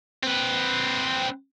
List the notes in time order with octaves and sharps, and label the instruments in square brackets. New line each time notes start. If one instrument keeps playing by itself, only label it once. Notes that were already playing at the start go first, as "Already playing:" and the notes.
[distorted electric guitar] C4 B4